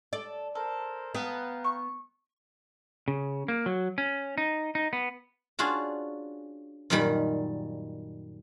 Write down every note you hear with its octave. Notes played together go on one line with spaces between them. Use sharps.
A4 D5
A4 A#4 C5
B3 F5 G5 A#5
C#6
C#3
A#3
F#3
C#4
D#4
D#4
B3
C#4 D4 F4 F#4 G#4
F#2 A#2 D#3 G3 B5